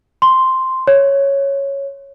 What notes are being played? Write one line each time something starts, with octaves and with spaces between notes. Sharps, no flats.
C6
C#5